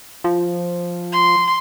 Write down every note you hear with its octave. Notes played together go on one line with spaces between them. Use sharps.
F3
C6